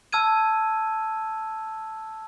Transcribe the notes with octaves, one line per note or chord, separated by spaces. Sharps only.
A5 E6 F6 G#6 D#7